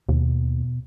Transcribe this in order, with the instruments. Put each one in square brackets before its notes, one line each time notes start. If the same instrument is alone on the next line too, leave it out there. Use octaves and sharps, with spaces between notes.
[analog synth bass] D#2 [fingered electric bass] B2